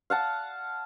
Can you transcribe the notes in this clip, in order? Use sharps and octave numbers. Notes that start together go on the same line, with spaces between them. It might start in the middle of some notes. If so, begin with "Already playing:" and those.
F5 F#5 A5